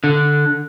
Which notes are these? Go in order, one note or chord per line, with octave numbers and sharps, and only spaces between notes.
D3